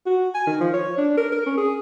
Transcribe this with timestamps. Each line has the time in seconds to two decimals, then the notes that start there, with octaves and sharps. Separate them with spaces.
0.06 F#4
0.34 G#5
0.47 D#3
0.60 F3
0.74 C#5
0.98 D4
1.17 A#4
1.32 A#4
1.46 C#4
1.57 G#4